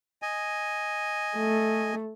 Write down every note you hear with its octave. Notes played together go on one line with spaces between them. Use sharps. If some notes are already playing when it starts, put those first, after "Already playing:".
D#5 G#5
A3